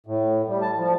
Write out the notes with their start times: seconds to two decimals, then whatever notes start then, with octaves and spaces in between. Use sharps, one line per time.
0.06 A2
0.48 G3
0.62 A5
0.77 F3